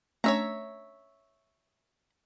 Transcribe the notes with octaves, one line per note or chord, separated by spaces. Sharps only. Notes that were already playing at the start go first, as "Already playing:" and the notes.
A3 C#4 D4 C#5 E5 A#5